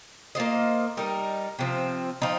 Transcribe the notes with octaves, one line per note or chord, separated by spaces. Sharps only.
A#3 F4 C5 D#5
G3 D#4 A#4
C3 F3 C4
F3 C4 D#4